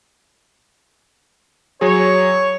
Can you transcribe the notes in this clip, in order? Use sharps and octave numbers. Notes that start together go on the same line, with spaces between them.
F#3 G#4 C#5